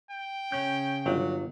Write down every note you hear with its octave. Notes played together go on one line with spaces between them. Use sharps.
G5
C#3 C#4 G6
G1 F#3